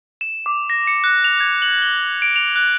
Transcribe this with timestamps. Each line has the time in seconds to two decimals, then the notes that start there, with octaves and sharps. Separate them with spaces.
0.21 E7
0.46 D6
0.70 A#6
0.87 C#7
1.04 F#6
1.24 F7
1.40 G#6
1.62 F#7
1.82 G7
2.22 D7
2.36 F7
2.56 F#6